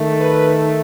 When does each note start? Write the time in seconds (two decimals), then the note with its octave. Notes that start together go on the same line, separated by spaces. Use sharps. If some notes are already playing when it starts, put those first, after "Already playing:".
Already playing: D#3 A3
0.20 B4